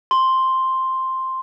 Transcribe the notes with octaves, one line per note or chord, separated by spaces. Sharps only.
C6